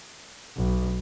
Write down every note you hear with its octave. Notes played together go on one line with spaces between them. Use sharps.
B1